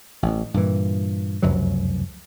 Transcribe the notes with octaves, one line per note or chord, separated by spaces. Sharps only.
A1
G2 A#2 E3
F1 C#2 F#2 F#3